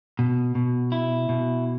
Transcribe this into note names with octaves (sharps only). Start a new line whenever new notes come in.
B2
B2
E4
B2